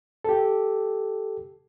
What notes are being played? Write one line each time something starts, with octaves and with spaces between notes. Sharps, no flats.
G4 A4